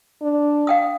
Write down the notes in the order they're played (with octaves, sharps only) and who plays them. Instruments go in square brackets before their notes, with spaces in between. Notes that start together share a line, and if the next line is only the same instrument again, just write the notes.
[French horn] D4
[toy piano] F5 G5 D#6